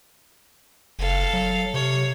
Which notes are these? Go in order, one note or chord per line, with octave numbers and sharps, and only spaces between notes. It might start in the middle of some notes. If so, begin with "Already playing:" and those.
F#1 A4 F5
F#3
C3 C#5